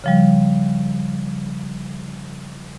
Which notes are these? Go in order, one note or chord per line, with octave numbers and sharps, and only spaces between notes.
C#3 F3 G3